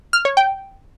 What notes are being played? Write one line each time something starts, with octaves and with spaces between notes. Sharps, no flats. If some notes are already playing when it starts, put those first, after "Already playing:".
F6
C#5
G5